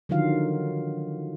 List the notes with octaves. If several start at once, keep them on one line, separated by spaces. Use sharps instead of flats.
D3 D#3 F3 F#3 F4 F5